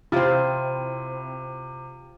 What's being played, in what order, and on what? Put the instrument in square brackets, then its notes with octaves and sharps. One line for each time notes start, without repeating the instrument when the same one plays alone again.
[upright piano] C3 [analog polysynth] C4 E4 [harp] F4 C5